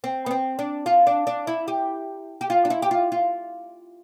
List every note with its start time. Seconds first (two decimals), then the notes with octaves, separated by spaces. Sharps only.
0.04 C4
0.26 B3
0.31 C4
0.59 D4
0.86 F4
1.07 D4
1.27 D4
1.47 E4
1.68 G4
2.41 G4
2.50 F4
2.65 D4
2.70 E4
2.82 G4
2.91 F4
3.12 F4